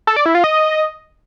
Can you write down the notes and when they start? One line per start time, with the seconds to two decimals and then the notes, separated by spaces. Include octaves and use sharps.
0.07 A4
0.16 D5
0.26 E4
0.35 F4
0.44 D#5